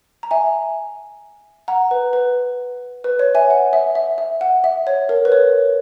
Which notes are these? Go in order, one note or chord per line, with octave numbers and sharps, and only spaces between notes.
A#5
E5 G#5
F#5 A#5
B4
B4
B4
C#5
E5 G#5
F#5
E5
E5
E5
F#5
E5
C#5
A#4
B4
C#5